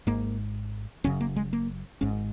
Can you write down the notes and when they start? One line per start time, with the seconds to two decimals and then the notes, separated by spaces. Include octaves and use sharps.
0.07 G#1 G#2 A#3
1.04 F#1 F#2 C#3 C#4
1.21 A#3
1.36 G#3
1.53 A#3
2.01 G#1 G#2 C#4